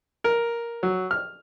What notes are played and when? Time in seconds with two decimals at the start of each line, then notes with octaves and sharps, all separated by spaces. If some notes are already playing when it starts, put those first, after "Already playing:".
0.24 A#4
0.83 F#3
1.11 F6